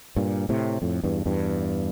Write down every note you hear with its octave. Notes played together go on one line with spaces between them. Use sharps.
G2 A#2
A2 C3
F2 A2
E2 G2
E2 G2